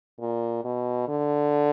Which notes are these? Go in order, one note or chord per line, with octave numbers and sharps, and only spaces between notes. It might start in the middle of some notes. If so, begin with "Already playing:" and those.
A#2
B2
D3